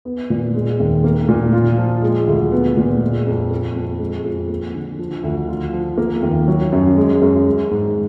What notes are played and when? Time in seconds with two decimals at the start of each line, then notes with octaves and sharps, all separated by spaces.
0.05 B3
0.30 A#2
0.55 G#3
0.80 D#2
1.04 A#3
1.29 A#2
1.53 F4
1.78 F3
2.02 G#3
2.27 D2
2.52 B3
2.77 A#2
3.01 G#3
3.26 F2
3.51 A#3
3.76 F2
4.01 G#3
4.25 F2
4.49 A#3
4.75 D3
4.99 F3
5.23 D2
5.49 F4
5.73 F3
5.98 A#3
6.23 D#2
6.48 F#3
6.72 F#2
6.97 G#3
7.22 F#2
7.47 G#3
7.71 G#2